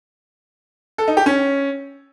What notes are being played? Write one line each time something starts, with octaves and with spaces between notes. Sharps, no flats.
A4
D#4
G4
C#4